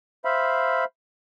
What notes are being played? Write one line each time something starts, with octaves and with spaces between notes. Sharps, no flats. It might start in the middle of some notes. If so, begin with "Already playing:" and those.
C5 E5 F5 B5